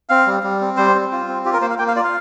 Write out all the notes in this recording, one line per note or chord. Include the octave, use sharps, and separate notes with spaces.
C4 F5
G3
G3
C4
G3 C5
C4
F4
C4
F4 G4
A#4
A#3 C5
F5
A#3 G5
F5
F4 D5
F5